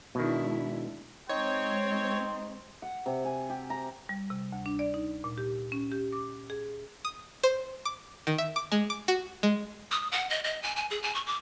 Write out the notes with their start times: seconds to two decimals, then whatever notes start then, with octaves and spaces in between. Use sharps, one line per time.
0.15 B2 D#3 G#3 D4 E4
1.29 G#3 C4 D#4 C#5 G5 C6
1.91 D#4
2.82 F#5
3.06 C3
3.25 G#5
3.50 G4
3.70 A#5
4.09 G3
4.30 C3
4.52 D2
4.66 D4
4.79 D5
4.94 D#4
5.24 A#2
5.38 G4
5.72 C#4
5.92 G4
6.13 D6
6.50 G#4
7.05 D#6
7.43 C5
7.85 D6
8.27 D#3
8.38 E5
8.56 D6
8.72 G#3
8.90 D6
9.08 F#4
9.43 G#3
9.91 D#6
10.12 F#5
10.30 D#5
10.44 D#5
10.63 G#5
10.76 G#5
10.90 G#4
11.02 G#5
11.15 C#6
11.26 D6